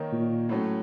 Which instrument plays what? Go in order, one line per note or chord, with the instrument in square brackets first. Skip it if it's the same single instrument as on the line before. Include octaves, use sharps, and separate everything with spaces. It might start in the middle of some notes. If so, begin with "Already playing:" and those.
Already playing: [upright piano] D#3 A#3 D#4 A#4 C#5
[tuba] A#2
[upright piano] A2 F#3 A3 C#4